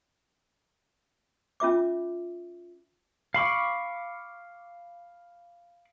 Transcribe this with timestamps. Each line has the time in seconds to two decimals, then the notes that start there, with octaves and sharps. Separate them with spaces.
1.60 C#4 F4 E5 D6
3.34 F5 B5 C#6 D6